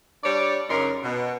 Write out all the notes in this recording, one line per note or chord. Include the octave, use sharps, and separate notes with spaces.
G3 D4 C#5 D5
F#2 C#3 C#4 D#4 A#4 C6
B2